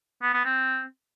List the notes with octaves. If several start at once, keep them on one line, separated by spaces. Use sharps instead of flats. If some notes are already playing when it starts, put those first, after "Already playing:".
B3
B3
C4